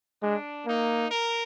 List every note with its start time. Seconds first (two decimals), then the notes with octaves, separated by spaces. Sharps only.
0.22 G#3 D4
0.66 A#3 D#4
1.11 A#4